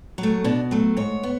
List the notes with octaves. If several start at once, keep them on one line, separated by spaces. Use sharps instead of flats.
F#3
A3
B2 D4
F#3 A3
G#2 C#5
B3